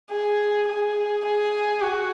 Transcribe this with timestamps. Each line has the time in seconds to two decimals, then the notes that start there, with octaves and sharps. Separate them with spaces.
0.11 G#4
0.68 G#4
1.25 G#4
1.82 F#4